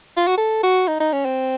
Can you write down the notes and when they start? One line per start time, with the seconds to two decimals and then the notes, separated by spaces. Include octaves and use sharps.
0.17 F4
0.28 F#4
0.38 A4
0.63 F#4
0.88 D#4
1.00 D#4
1.13 C#4
1.25 C4